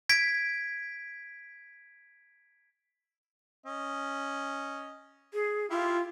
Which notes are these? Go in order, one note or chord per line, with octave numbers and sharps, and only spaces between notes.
G#6 B6 D7
C#4 D#5
G#4
E4 F4 G4 F5